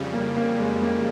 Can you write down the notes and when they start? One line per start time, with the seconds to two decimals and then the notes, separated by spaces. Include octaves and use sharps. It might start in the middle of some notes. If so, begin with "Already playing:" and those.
Already playing: F2 C#3 G3
0.13 A#3
0.36 A#3
0.59 G#3
0.82 A#3